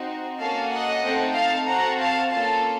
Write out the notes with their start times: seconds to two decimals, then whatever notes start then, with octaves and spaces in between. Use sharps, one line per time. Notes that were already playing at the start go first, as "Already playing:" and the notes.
Already playing: C4 D#4 F#4
0.40 A#3 C#4 F#4 A4 F5 A5
0.72 D#5 F#5
1.04 A3 C4 D#4 A4
1.36 F5 A5
1.67 C4 F#4 A4 F#5 A#5
1.99 F5 A5
2.32 A#3 C#4 F4 A4 F5 A5